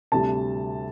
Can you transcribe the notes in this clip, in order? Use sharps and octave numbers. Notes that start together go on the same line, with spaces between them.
D2 C3 G3 A5